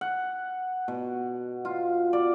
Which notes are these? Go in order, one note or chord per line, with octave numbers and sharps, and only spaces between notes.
F#5
B2
F4
D5